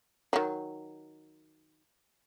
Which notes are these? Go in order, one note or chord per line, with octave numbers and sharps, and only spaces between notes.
D#3 F#3